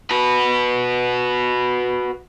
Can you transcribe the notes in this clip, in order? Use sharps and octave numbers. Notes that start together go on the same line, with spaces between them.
F#4 B4